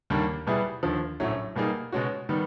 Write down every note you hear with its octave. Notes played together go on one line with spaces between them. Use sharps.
D#2 D3 G3 A#3 D4
B2 G3 B3 E4 G#4
D#2 D3 F3
A#1 A2 F#3 A3 C#4
B2 G3 A#3 D#4 G#4
B2 G#3 C#4 F#4
D#3 G3 B3